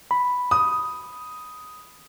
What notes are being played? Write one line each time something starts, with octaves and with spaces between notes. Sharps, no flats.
B5
D#6